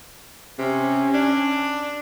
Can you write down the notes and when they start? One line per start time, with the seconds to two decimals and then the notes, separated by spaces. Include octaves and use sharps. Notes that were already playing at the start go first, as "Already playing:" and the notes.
0.59 C3 C#4
1.14 D4